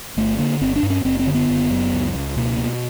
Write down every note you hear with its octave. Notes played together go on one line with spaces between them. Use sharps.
G1 A3
D3 A#3
G1 C4
D4
G2
C#4
F#1 C4
C4
D3
B3
F#1
F#2
C#2
C#2
B2 A#3
B2